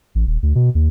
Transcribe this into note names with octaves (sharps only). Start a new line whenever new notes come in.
A1
D#1
D2
B2
D#2